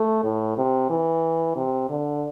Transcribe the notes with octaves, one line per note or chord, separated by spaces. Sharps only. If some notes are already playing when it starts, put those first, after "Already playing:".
Already playing: A3
A2
C3
E3
C3
D3